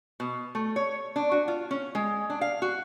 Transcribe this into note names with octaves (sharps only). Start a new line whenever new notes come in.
B2
A3
C#5
D4
F#4
F4
C#4
G#3
D4
F5
F#4